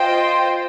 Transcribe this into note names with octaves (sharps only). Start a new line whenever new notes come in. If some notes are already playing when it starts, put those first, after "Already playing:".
Already playing: F4 C5 D#5 G5